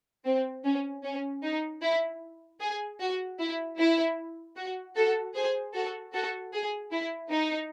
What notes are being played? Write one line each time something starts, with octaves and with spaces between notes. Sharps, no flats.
C4
C#4
C#4
D#4
E4
G#4
F#4
E4
E4
F#4
F#4 A4
G#4 C5
F#4 A4
F#4 A4
G#4
E4
D#4